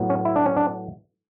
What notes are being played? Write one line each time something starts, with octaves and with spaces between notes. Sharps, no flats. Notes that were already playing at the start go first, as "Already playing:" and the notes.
Already playing: A2 F#3 B3
C#4
E4
D4
C#4
D4